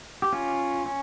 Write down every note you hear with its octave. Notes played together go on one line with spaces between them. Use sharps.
G4
C#4 F4
C#4